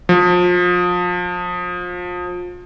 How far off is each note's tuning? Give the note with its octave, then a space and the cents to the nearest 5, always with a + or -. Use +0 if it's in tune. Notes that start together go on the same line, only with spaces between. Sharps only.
F3 +30